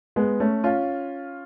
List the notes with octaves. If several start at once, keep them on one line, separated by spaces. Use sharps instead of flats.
G#3 B3
A3 C#4
C#4 F4